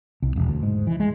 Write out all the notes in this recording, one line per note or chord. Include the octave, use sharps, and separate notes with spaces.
C2
E1
D2
G#2
E3
G#3